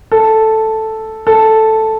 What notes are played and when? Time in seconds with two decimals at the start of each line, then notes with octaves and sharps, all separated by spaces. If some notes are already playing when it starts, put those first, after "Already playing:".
0.12 A4
1.27 A4